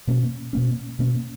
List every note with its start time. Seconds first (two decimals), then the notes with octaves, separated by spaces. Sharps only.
0.07 B2 A#3 C#4
0.53 B2 A#3 C#4
0.99 B2 A#3 C#4